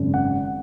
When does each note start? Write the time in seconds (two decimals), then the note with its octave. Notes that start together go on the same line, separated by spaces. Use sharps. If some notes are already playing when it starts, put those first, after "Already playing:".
Already playing: G#1 F#2 C#3
0.14 F#5